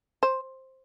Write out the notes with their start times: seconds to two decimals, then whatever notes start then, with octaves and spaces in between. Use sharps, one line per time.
0.23 C5